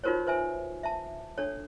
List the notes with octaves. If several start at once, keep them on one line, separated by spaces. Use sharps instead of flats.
D#4 F4 F#4 A#4 C5 C#5
B4 C5 E5 G#5
E5 A5
D4 A4 C#5